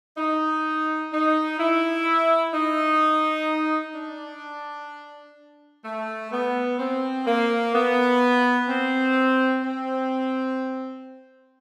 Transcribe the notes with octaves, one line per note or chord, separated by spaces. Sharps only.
D#4
D#4
E4
D#4
D4
A3
B3
C4
A#3
B3
C4
C4